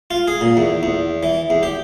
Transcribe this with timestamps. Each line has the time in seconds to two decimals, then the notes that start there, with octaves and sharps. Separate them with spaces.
0.11 F4
0.28 G#4
0.41 A#2
0.57 E2
0.83 E2
1.23 E3
1.50 E2
1.63 G4